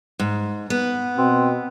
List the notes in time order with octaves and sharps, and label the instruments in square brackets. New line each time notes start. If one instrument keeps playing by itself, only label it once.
[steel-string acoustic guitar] G#2
B3
[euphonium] B2 [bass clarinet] C4